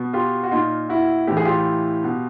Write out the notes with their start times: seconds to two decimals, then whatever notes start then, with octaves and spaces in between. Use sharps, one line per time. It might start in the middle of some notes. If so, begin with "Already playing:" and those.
Already playing: B2
0.13 F4 G4
0.43 F#4
0.51 A#2 D#4 F4
0.89 E4 F#4
1.27 A2 E3 G4
1.37 G#4
1.45 F4 G4
2.04 B2